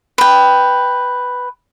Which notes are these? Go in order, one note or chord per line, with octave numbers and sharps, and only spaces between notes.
B4 G5